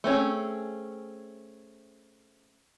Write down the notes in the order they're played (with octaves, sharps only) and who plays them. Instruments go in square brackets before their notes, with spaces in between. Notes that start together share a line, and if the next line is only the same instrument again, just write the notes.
[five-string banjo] A3 C4 C#4 G#4